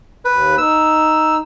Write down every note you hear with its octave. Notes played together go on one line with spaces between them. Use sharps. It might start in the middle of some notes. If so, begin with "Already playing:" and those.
D#2 B4
D#4 E6